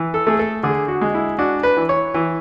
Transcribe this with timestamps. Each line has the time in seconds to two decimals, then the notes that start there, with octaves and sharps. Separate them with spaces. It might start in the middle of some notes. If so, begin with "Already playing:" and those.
Already playing: E3
0.14 A4
0.27 A3 G#4
0.39 A4
0.63 D3 G#4
0.88 F#4
1.01 G#3
1.14 E4
1.39 D4 F#4
1.63 B4
1.77 E3
1.89 C#5
2.14 E3